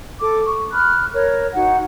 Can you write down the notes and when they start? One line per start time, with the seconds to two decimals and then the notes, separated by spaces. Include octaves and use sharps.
0.20 A4 D6
0.45 C#6
0.73 B5 F6 F#6
1.14 A#4 C#5
1.55 D#4 F#4 F#5